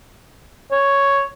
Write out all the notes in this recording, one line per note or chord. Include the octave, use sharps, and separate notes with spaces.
C#5